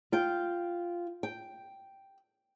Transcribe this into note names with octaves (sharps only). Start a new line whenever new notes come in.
F4 G5
G5